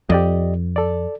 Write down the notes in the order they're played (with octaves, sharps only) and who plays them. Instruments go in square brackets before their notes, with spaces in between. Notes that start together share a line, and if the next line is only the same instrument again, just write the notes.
[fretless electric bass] F2 [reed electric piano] G4 D5 D#5
[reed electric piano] A4 D5